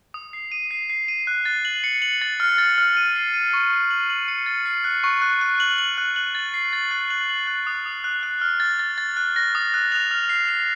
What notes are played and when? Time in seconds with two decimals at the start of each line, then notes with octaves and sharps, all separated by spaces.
0.14 D#6
0.33 C7
0.51 D#7
0.71 C7
0.90 C7
1.08 D#7
1.27 F#6
1.45 A6
1.65 F#7
1.84 C#7
2.02 F#7
2.21 A6
2.40 F6
2.58 A6
2.78 F6
2.97 D#7
3.15 C7
3.34 D#7
3.53 C#6
3.72 C7
3.90 F#7
4.10 F#7
4.28 C#7
4.46 A6
4.66 C7
4.84 F#6
5.04 C#6
5.22 F#6
5.41 F#6
5.60 F#7
5.78 F#7
5.98 F#6
6.16 F#7
6.35 A6
6.54 C7
6.73 A6
6.91 F#6
7.10 F#7
7.29 F#7
7.47 F#6
7.67 D#6
7.86 D#6
8.04 F#6
8.23 F#6
8.42 F6
8.60 A6
8.79 A6
8.98 A6
9.17 F#6
9.36 A#6
9.55 D#6
9.74 F#6
9.92 F7
10.11 F6
10.29 C7
10.49 F7